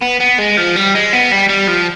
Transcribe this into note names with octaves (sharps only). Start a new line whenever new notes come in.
B3
B3
G#3
F3
G3
G#3
B3
G3
G3
F3